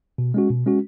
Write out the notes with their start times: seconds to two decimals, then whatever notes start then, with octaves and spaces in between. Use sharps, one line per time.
0.18 B2
0.34 G#3 C#4 F#4
0.50 B2
0.66 G#3 C#4 F#4